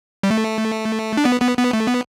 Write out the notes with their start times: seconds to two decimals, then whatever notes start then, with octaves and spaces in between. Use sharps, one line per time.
0.23 G3
0.31 A3
1.17 D4
1.25 B3
1.41 B3
1.57 B3
1.73 A3
1.87 B3